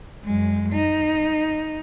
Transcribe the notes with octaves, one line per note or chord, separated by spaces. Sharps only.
F#2 G#3
D#4